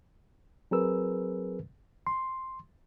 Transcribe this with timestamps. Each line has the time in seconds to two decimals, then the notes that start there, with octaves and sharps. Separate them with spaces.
0.71 F#3 C4 G#4 A#4 B4 E6
2.07 C6